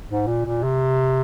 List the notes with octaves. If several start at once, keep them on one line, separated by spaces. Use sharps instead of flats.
G#2
A#2
A#2
C3